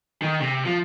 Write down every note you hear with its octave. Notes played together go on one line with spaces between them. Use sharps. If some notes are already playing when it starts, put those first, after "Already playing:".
D#3
C3
F3